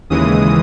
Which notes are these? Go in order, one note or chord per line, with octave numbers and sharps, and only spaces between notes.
D#2 C#3 E3 G#3 D#6